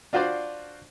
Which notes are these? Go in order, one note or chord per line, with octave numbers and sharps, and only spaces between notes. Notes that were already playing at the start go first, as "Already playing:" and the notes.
D4 F4 F#4 C5 D5